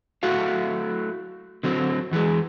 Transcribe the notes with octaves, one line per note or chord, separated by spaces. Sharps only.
F#3 A3 E4 F#4 F5
D3 F#3 C4
E2 E3 G3 G#3